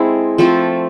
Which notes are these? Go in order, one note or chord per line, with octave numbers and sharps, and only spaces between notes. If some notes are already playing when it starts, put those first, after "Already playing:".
Already playing: G#3 C4 E4 A4
F3 A3 C4